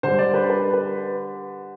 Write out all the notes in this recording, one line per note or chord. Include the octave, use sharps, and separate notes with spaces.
D3 G3 C5
D5
B4
B4
B4